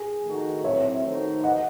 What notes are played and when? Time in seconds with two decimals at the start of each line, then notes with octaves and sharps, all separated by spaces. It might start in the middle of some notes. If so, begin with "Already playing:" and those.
Already playing: G#4
0.25 D#3 A3 D#4 F#4
0.64 A2 F#3 C4 C#5 E5
1.04 D#3 A3 D#4 F#4 C5
1.44 D#5 F#5